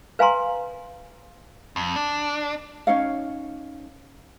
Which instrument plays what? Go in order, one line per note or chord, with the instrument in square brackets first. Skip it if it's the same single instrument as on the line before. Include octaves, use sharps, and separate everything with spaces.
[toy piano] B4 F5 G#5 A#5 C6
[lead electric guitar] F2
D4
[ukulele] C#4 D#4 C#5 F5